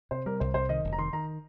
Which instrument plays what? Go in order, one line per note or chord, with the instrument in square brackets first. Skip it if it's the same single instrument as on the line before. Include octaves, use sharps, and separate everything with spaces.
[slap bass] C3 [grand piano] C5
[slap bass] G3 [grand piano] A#4
[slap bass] C2 [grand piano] C5
[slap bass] C2 [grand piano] C5
[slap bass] D#3 [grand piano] D#5
[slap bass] F1
[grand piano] A#5
[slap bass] D#3 [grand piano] C6
[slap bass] D#3 [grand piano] A#5